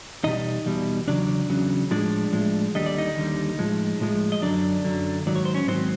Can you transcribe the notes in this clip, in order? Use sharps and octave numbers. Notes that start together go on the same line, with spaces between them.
E2 B2 G3 D#4 D#5
E2 B2 G3
E2 C#3 F#3 D4 D5
E2 C#3 F#3
A2 F3 G#3 D4 D5
A2 F3 G#3
D#2 D3 G3 D#5
D5
D#4 D#5
D#2 D3 G3
A2 F3 G#3
A2 F3 G#3
D#5
F#2 D3 F#3 D4 D5
F#2 D3 F#3
G#2 D#3 F#3 D5
C#5
C5
C#4 C#5
G#2 D#3 F#3 C4 C5